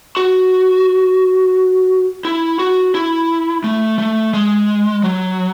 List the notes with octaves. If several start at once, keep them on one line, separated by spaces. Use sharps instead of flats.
F#4
E4
F#4
E4
A3
A3
G#3
F#3